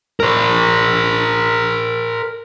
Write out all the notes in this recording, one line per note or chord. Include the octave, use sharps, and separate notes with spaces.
A#4 C5